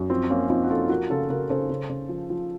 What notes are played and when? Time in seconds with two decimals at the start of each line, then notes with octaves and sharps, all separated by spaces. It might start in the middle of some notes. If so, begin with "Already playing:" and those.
Already playing: F#2
0.10 F3 C4
0.30 F3 A#3 C#4
0.50 F3 C4 D#4
0.64 F#4
0.70 F3 F4 A4
0.89 F3 F#4 A#4
1.10 C#3 F4 A4
1.29 C#3 F#4 A#4
1.50 C#3 A4 C5
1.70 C#3
1.89 C#3
2.09 F3
2.30 F3